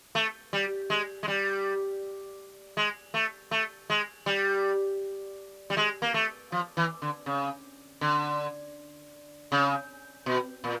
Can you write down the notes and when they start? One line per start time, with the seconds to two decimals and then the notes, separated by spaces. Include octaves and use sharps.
0.15 A3
0.53 G3
0.90 G#3
1.23 G#3
1.28 G3
2.77 G#3
3.14 A3
3.51 A3
3.90 G#3
4.26 G3
5.70 G3
5.77 G#3
6.02 A#3
6.14 A3
6.52 F3
6.77 E3
7.02 D3
7.26 C#3
8.01 D3
9.52 C#3
10.26 B2
10.64 A#2